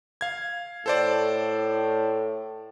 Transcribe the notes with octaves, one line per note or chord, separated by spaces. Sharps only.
F5 G#6
A2 A4 C5 D5